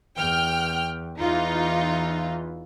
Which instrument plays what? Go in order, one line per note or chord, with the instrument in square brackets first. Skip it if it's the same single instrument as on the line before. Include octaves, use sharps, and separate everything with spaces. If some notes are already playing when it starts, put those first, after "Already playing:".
[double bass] E2 [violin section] G5 F6
[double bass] E2 E3 [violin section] D#4 F4